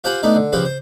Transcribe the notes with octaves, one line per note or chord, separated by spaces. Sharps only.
F4 G4 C5 F#5 G#5 B5
A3 B3 D4 D#4 D5
D3
C#3 F3 C4 G4 B4
C5